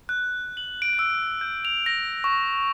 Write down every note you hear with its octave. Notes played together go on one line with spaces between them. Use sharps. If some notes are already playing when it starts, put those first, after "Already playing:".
F#6
F#7
D7
E6
G6
F7
A#6
C#6